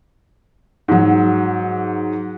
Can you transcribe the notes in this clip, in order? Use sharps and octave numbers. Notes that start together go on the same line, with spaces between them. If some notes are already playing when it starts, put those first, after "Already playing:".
G#2 F#3